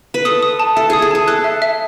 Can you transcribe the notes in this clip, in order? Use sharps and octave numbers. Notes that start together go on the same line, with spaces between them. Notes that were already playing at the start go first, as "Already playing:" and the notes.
B4
A4 D#6
D#6
A5
A4 E5
G#4 D#6
A4
G#4 A5
A4 F#6
E5
E5